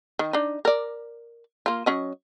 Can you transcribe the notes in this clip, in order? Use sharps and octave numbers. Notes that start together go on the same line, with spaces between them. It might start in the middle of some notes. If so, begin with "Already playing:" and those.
D#3
D4 D#4
A#4 D5
A#3 F4
F#3 C#4 D#5